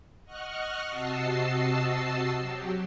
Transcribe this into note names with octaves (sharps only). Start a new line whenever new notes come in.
D#5 F#5 C#6 F6 F#6
C3 F#4 D#5 A5 E6 C7
F#3 G4